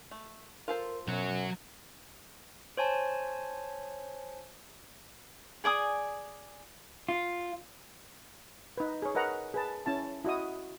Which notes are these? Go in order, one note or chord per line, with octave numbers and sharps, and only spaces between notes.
A3
F4 A4 A#4 C5
F#2 B2 F#3 F#4
C5 C#5 G#5 A5
G#4 D5 G#5 D#6
F4
D#4 B4
G#4 C#5
A#4 B4 D#5 F#5 A#5
G#4 B4 A5
C#4 E4 A5
E4 F#4 D#5 D#6